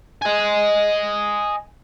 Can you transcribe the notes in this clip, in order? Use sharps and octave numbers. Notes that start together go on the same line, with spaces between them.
D#5 G#5